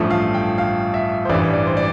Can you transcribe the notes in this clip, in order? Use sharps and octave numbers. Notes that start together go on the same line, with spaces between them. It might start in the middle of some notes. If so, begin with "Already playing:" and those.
Already playing: A1 G2 F3 A3
F5
G5
F5
E5
C5
A1 G2 E3 G3 D5
D5
C5
D5